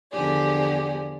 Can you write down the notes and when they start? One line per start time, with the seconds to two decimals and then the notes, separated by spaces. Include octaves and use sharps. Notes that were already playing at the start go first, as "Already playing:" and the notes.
0.11 E2 D3 F3 G4 G#4 D5